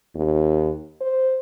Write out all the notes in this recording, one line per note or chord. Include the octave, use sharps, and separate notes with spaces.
D#2
C5